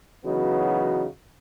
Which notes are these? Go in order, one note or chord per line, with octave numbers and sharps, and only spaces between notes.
C#3 E3 F#3 B3 D#4 F#4